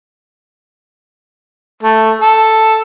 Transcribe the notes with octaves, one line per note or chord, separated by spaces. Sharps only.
A3
A4